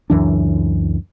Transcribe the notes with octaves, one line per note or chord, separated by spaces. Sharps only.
C#2 F#2 E3 D4